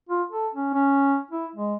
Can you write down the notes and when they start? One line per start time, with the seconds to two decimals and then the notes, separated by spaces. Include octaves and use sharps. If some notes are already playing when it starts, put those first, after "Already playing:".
0.09 F4
0.31 A4
0.55 C#4
0.74 C#4
1.31 E4
1.55 G#3